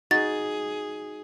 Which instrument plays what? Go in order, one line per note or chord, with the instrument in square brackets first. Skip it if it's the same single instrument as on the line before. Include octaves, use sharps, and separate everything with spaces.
[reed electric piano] D#4 F#4 [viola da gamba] G#4 [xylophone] A6